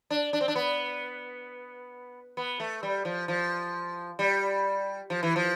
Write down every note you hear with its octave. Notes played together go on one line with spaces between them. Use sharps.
D4
D4
C4
D4
B3
B3
A3
G3
F3
F3
G3
F3
E3
F3